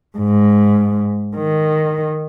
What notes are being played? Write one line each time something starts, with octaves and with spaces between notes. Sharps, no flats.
G#2
D#3